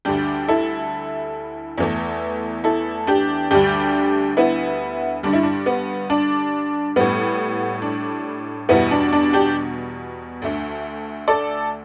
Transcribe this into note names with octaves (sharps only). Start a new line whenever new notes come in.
D2 D3 G3 D4 G4
E4 A4
E2 E3 A3
E4 A4
D4 G4
D2 D3 G3 D4 G4
B3 E4
G2 D3 G3 D4
E4
D4
B3
D4
A2 G3 B3
D4
E2 B2 G3 B3 E4
D4
D4
D4 G4
D2 D3 A3
A4 D5